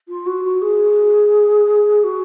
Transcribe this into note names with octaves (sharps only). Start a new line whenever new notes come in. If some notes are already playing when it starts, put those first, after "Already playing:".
F4
F#4
F#4
G#4
F#4